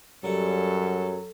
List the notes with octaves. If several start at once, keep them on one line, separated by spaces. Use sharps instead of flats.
F#2 F#3 G3 A4 F#5